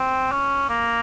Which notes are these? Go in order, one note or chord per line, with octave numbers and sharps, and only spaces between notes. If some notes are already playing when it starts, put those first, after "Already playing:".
Already playing: C4
C#4
A#3